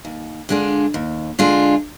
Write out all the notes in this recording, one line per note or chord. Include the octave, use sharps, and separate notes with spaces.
D#2
D3 G#3 D4 F4
D#2
D3 G#3 D4 F4